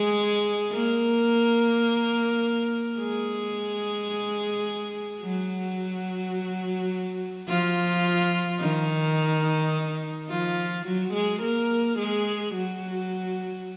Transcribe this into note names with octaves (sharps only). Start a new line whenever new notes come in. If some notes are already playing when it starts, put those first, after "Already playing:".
Already playing: G#3 G#4
A#3 A#4
G#3 G#4
F#3 F#4
F3 F4
D#3 D#4
F3 F4
F#3 F#4
G#3 G#4
A#3 A#4
G#3 G#4
F#3 F#4